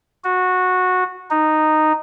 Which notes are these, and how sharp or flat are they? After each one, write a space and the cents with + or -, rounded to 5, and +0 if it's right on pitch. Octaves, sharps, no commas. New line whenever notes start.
F#4 -15
D#4 -10